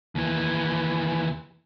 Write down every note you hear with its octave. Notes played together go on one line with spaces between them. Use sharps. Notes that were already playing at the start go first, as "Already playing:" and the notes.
D#2 E3